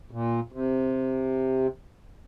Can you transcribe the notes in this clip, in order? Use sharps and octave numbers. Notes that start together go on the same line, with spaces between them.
A#2
C3